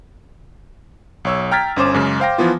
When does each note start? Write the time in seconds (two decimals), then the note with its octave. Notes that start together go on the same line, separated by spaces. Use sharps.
1.25 B1 C#5 E6
1.51 G5 A#5 F6 G#6 A6 B6
1.76 G1 C#4 C5 D6 E7
1.94 F#2 C#3 G#3
2.20 C5 F5 G5 A#6
2.38 E3 F3 B3 F4